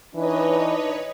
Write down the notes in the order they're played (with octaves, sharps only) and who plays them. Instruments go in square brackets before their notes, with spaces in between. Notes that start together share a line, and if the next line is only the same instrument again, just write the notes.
[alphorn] E3 [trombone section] D4 D#4 [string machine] B4 C#5 D#5